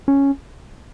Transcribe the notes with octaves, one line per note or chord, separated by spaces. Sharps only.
C#4